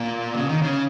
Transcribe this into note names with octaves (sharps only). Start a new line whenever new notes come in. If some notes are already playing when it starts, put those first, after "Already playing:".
Already playing: A#2
C#3
D#3
C#3